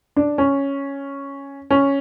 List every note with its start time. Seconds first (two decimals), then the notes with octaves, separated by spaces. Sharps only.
0.16 D4
0.38 C#4
1.71 C#4